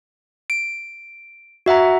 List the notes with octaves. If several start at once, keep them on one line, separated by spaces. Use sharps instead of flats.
D7
F#4 E5 F#5 A#5